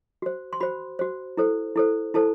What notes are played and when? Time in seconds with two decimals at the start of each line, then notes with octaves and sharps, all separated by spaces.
0.22 F#4 C5
0.53 C6
0.60 F#4 C5 B5
0.99 F#4 C5
1.37 E4 A4 C5
1.76 E4 A4 C5
2.14 E4 A4 C5 A5